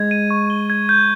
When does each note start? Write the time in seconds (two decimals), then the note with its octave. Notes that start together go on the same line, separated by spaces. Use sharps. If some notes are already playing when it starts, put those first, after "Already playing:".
Already playing: G#3 G#6
0.11 D#7
0.31 C#6
0.50 G7
0.70 G#6
0.89 G6